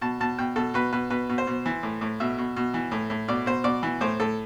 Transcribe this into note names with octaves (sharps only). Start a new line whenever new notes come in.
B2 A5
B2 A5
B2 G5
B2 A4
B2 B4
B2 B4
B2 B4
B2
C5
B2
E3
A2
A2
B2 E5
B2
B2
E3
A2
A2
B2 D5
B2 C5
B2 D5
E3
A2 C5
A2 A4